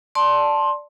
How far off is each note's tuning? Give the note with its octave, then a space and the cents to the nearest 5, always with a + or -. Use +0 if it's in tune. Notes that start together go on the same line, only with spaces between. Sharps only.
D5 +0 A5 +0 C6 +15